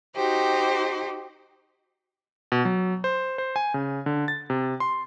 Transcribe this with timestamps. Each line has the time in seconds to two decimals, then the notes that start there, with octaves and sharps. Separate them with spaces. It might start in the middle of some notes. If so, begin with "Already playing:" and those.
0.15 D#4 F#4 G4 C5
2.52 B2
2.65 F#3
3.04 C5
3.38 C5
3.56 G#5
3.74 C#3
4.06 D3
4.28 A6
4.50 C3
4.80 C6